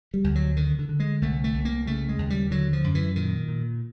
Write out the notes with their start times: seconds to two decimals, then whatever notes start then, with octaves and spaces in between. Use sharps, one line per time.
0.14 G3
0.24 D2
0.35 F#3
0.57 D3 D#3
0.79 D3
0.89 D3
1.00 G#3
1.21 C2 A3
1.44 A3
1.54 C2
1.65 A#3
1.86 C#3 A3
2.09 G#3
2.18 D#2
2.30 G3
2.51 D3 F#3
2.73 F3
2.84 F#2
2.95 E3
3.16 A#2 D#3
3.48 A#2